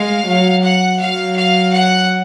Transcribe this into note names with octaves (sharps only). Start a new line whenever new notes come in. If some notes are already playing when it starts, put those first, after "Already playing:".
Already playing: G#3 F5
F#3
F#5
F#3 F5
F5
F#5